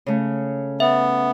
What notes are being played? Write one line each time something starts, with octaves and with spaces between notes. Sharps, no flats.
C#3 A3
B3 E5